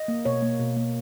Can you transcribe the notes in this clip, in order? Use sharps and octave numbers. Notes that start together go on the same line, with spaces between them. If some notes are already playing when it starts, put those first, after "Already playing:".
Already playing: D#5
A#3
B2 C#5
A#3
B2
A#3